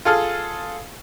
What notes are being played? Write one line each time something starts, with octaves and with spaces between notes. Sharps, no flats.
F4 G#4 A4 F6